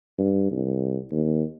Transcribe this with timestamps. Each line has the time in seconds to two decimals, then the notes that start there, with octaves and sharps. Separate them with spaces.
0.18 G2
0.51 C2
1.11 D#2